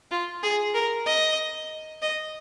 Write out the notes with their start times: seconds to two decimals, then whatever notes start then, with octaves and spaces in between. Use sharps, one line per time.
0.11 F4
0.43 G#4
0.74 A#4
1.06 D#5
2.02 D#5